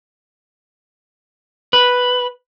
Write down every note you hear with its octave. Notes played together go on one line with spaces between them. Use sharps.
B4